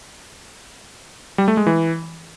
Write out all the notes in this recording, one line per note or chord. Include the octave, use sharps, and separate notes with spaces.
G3
A3
G#3
E3